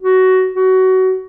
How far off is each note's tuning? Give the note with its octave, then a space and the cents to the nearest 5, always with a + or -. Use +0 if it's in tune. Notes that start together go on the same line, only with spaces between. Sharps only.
F#4 +15
F#4 +20